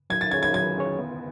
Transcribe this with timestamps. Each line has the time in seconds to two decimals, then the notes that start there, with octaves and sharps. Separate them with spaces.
0.10 F#3 G#6
0.21 A6
0.31 C#4 G#4 C#5 G#6
0.43 G#6
0.54 F#3 G#6
0.77 C#4 G#4 C#5
0.98 B3